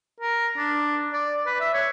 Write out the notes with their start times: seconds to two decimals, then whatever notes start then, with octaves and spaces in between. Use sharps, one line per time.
0.20 A#4
0.57 D4
1.13 D5
1.46 B4
1.60 E5
1.74 C#5